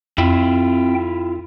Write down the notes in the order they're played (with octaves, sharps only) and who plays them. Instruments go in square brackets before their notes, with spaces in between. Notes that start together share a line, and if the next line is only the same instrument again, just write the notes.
[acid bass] F2 [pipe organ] C4 G5 [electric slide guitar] E4 F4